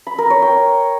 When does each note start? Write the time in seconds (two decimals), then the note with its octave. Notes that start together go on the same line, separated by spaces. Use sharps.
0.07 B5
0.18 A#4
0.30 C#5
0.42 G5